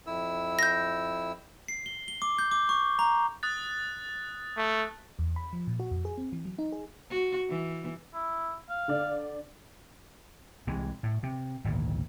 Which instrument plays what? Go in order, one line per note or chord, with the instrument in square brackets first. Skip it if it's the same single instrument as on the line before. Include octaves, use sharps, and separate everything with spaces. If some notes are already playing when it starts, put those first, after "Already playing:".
[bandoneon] F2 E4 E6
[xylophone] G6 A#6
[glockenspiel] C7
G7
G7
D6
G6
D6
C#6
A#5
[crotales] D#6 F#6 A6
[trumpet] A3
[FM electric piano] E2
B5
F3
A#2
F#4
F2
G#4
C4
E3
F#3
D#4
G#4
[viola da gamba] F#4
E3
[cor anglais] E4
F5
[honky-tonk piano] D3 D5
[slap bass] C2 C3 E3 G#3
A2
C3
G#1 D2 A#2